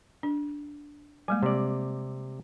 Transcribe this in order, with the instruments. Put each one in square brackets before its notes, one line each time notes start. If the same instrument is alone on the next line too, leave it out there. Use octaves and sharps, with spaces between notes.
[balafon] D4
[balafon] G3 G#3 A#3 [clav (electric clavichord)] G#5
[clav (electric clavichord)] C3 D5